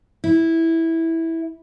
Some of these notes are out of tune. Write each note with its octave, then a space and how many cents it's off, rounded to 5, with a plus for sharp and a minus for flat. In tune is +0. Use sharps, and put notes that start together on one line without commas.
E4 -10